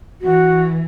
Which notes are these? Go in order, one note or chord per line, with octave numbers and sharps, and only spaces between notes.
E3 F#4